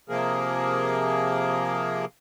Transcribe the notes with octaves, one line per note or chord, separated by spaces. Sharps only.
C3 F3 A#3 G#4 A#4